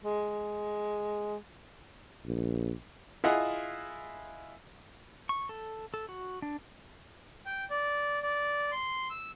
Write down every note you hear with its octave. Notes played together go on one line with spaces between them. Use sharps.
G#3
A#1
E4 F4 G#4 D#5 F#5
C#6
A4
A4
F#4
D4
G5
D5
D5
C6
E6